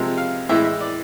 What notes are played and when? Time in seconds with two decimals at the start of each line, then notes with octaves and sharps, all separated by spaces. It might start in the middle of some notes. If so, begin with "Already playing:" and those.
Already playing: C3 F3 G#3 E5
0.18 F5
0.49 A2 E3 G#3 E5
0.65 E5
0.81 D5